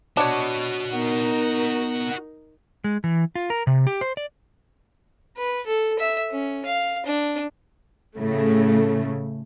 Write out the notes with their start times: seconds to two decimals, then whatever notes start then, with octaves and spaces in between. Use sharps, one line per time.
0.17 D4 F#4 C#5 D#5
0.93 B3 D#4 A#4
2.84 G#3
3.04 E3
3.35 F4
3.50 A#4
3.67 C3
3.87 G4
4.01 C5
4.17 D5
5.37 B4
5.66 A4
5.99 E5
6.31 C#4
6.65 F5
7.06 D4
8.17 A2 C#3 A3